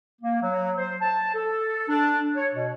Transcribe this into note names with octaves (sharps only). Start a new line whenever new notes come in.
A#3
F#3
C5
A5
A4
D4
C#5
B2